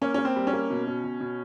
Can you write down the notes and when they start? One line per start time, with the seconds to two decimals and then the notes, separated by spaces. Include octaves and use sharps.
0.01 A#3 C#4
0.14 A#3 C#4
0.25 C4
0.36 G3
0.47 C#4
0.53 A#3
0.70 B2
0.87 B2
1.04 B2
1.20 B2